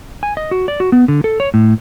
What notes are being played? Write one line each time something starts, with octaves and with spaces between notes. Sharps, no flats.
G#5
D#5
F#4
D5
F#4
B3
D3
A4
C#5
A2